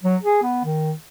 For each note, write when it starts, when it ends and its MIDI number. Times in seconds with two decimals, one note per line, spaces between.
0.04 0.17 54
0.23 0.41 68
0.43 0.62 59
0.65 0.93 51